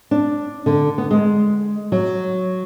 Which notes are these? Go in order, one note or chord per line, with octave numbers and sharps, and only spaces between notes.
D4
D3
B3
G#3
F#3